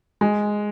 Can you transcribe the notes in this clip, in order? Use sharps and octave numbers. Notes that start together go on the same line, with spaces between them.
G#3